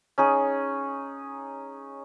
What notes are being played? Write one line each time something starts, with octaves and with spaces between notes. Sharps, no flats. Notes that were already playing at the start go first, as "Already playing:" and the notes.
C#4 D#4 G#4